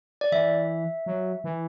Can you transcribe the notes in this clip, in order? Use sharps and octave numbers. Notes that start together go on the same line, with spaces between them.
D5
E3 E5
F#3
E3